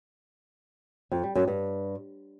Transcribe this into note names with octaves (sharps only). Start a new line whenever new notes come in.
F2
G3
F#2
G2